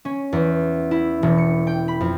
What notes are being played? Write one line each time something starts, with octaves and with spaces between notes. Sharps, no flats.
C#4
E2
E4
E1
C#7
G5
B5
F2